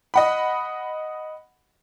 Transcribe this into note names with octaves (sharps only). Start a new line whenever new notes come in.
D#5 F#5 B5